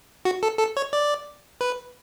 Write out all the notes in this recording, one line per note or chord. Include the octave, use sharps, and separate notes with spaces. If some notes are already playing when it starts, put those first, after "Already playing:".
F#4
A4
A4
C#5
D5
B4